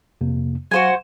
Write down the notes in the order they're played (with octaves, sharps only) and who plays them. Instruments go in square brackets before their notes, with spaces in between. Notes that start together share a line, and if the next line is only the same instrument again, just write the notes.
[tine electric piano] F2 C3 A#3
[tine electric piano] F#3 F5 [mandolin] F#4 C5 G#5